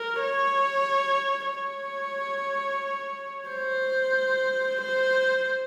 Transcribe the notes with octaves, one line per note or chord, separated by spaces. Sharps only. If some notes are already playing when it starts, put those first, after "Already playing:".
Already playing: A#4
C#5
C#5
C5
C5